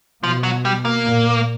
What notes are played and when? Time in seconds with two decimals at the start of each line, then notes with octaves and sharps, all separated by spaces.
0.23 B2 F3
0.43 F#3
0.65 G3
0.85 A#3
1.05 A#2